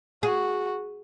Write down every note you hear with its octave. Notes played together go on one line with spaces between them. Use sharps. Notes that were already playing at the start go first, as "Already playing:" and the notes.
F#4 G#4